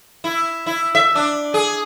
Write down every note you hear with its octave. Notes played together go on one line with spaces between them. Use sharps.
E4
E4
E5
D4
G#4